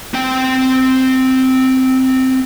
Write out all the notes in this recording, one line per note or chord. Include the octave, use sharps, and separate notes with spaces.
C4 G5